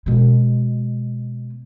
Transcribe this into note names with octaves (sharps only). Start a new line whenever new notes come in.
B2 G#3